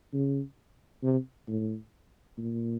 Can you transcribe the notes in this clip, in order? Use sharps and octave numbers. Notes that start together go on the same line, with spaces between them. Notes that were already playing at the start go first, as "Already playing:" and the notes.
C#3
C3
A2
A#2